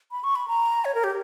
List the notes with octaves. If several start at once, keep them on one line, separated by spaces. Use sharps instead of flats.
B5
C#6
B5
A#5
C#5
A#4
G4